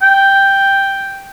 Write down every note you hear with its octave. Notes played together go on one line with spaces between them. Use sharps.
G5